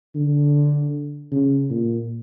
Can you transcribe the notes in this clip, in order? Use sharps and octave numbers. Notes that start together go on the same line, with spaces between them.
D3
C#3
A#2